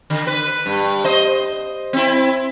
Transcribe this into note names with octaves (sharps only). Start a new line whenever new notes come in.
D3
B4
G2
C5 D#5
C4 E4